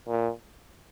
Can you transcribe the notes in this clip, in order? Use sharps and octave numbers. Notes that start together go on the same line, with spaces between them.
A#2